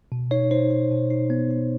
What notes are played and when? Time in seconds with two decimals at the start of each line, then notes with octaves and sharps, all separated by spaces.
0.12 B2
0.31 D#4 C#5
0.51 D#4 C5
0.71 D#4
0.91 B2
1.10 D#4
1.30 B3
1.51 D#4